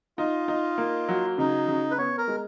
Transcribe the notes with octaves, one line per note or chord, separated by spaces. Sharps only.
D#4 F4
D#4
A#3
F#3
C#3 D#4
C#3
B4
B3 C#5
A#4
G#3